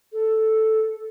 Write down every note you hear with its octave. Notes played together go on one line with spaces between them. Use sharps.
A4